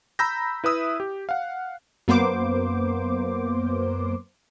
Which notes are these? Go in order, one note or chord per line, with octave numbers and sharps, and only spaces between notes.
A#5 B5 E6 G6 A#6
E4 B4 E5 D#6 E6
G4
F5 F#5
F#2 A#3 B3 C5 D6